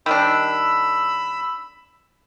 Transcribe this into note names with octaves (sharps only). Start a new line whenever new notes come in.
D#3 G3 D4 B5 E6